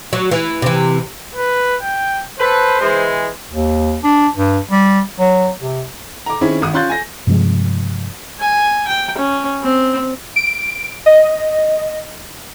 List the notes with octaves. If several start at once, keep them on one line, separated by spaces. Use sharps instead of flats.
F#3
E3
C3 E3
B4
G5
A4 B4 C5
E3 G#3
D#2
D4
G2
G3
F#3
C3
A#5 D6
D#3 C4 C#4 E4 G#4
G#1 D#6
C#4 F4 C6 F#6 G6 A6
G#5 A#6
G2 C3 F3 G#3
G#5
G5
C#4
C4
D7
D#5